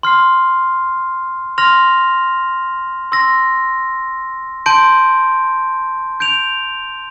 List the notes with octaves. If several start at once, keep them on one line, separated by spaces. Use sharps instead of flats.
C6 F6 C7
C6 F6 A#6 F7
C6 E6 A#6
A5 C6 G6 D7
G6 D7 F7